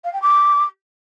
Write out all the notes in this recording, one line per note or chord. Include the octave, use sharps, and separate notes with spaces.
F5
G5
D6